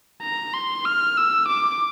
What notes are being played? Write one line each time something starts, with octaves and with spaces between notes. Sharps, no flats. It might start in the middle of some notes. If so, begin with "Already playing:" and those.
A#5
C6
F6
E6
D6